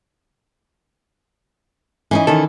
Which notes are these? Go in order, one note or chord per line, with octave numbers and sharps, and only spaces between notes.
E3 C#4 D#4
D#3 A4